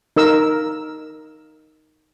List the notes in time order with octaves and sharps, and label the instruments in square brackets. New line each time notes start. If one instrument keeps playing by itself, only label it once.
[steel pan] D#4 A#4 E6